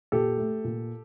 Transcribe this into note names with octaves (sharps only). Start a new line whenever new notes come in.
A#2 G4 A4
A3
A#2